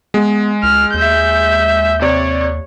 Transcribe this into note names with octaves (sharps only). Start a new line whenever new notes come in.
G#3 B3
C#2 F6
D#2 E5 G6
C3 C#5 D5